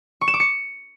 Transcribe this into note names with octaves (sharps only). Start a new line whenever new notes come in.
C#6
E7
D6
C#7